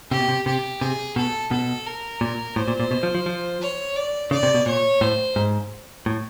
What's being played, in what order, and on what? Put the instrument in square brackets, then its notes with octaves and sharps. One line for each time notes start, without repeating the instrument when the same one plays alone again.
[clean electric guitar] C3 [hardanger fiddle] G4
[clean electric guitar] B2
C3
[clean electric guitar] C3 [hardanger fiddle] G4
[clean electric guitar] C3 [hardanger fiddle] G#4
[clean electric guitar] B2 [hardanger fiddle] A4
[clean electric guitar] B2 [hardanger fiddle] A4
[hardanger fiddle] A#4
[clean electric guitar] A#2
[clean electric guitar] A2 [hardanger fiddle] C5
[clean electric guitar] A#2
A#2
B2
F3
F3
F3
[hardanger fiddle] C#5
D5
[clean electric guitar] C#3 [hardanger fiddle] D5
[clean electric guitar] C3
B2
[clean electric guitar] A#2 [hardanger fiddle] C#5
[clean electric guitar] A2 [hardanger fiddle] C5
[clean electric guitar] G#2
A2